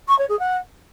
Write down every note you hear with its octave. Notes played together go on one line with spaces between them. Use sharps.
C#6
C#5
G#4
F#5